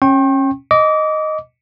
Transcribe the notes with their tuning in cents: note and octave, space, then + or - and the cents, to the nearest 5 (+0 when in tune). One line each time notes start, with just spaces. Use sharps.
C#4 -25 G5 +0 C#6 -45
D#5 +0 D6 -25